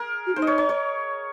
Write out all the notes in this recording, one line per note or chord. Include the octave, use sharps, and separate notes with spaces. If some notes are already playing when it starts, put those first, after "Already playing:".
Already playing: G#4 A#4
F#4
D#4 C5
D#5
C#5
C#5
C#5